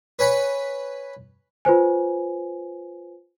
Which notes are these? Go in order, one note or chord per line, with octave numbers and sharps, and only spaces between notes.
B4 C#5 G#5 B5
F4 B4 C5 G#5